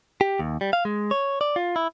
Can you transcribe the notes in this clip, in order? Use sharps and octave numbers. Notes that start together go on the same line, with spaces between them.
G4
D#2
G3
F5
G#3
C#5
D5
F4
E4